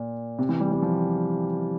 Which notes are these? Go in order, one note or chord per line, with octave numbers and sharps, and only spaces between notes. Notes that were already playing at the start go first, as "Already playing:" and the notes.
Already playing: A#2
C3
E3
G3
G3
F3